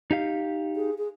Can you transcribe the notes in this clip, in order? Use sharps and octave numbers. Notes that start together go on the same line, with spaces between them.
D#4 G4 F5
G#4
G#4